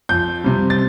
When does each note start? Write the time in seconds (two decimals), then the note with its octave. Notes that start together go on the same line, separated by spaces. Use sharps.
0.09 F2 G6
0.44 C3 G3
0.70 A6